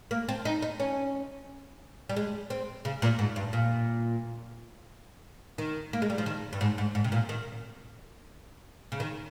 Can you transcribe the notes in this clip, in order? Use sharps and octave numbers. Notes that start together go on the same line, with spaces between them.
A#3
C4
D#4
D#4
C#4
G3
G#3
C4
C#3
A#2
G#2
G2
A#2
D#3
A#3
G#3
G3
F3
D#3
G2
G#2
G#2
G#2
C3
A#2
D#3
C#3
D#3